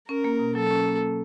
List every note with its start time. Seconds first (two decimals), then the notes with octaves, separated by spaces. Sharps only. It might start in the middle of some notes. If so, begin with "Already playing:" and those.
0.09 C#4 A#4
0.24 A#3
0.39 B2
0.55 F#3 A4
0.70 C#4
0.86 A#3